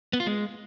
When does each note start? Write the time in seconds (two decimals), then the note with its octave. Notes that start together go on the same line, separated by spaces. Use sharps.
0.13 B3
0.20 F4
0.27 G#3